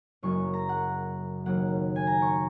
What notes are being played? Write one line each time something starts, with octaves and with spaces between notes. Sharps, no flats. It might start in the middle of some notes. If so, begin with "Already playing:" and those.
F#1 F#2 C#3 F#3 A#3 C#6
A#5
F#5
D#2 C#3 F#3 A#3 F#5
G#5
A#5
C#6